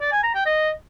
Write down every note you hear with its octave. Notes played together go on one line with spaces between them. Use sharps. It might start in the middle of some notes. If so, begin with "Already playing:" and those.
D5
G#5
A#5
G5
D#5